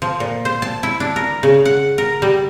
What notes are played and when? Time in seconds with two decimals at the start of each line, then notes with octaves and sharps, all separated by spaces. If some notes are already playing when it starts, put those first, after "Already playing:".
0.02 F3
0.20 A#2
0.45 C5
0.62 A5
0.83 E4
1.00 D4
1.16 A#4
1.43 C#3
1.65 F#5
1.98 A#4
2.22 G3